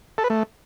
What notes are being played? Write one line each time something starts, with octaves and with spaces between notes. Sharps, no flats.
A4
B4
A3